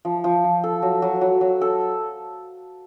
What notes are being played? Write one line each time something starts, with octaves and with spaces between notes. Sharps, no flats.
F3
F3
F3
A4
F#3
F#3
F#3
F#3
A4